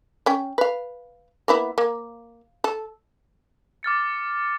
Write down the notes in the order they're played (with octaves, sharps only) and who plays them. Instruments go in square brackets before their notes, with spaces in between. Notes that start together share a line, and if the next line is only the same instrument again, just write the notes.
[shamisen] C#4 G5
B4 F5
A#3 B3 E4
A#3
A4
[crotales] D6 F6 A6 C#7